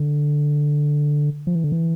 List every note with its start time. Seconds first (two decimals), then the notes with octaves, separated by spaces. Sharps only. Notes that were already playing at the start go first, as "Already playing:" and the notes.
Already playing: D3
1.47 F3
1.55 E3
1.64 D3
1.72 E3